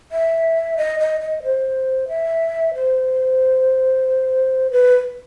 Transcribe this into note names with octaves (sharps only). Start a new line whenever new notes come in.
E5
D#5
D#5
D#5
C5
E5
C5
B4